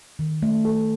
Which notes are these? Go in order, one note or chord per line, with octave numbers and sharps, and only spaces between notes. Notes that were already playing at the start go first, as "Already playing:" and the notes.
D#3
A3
A4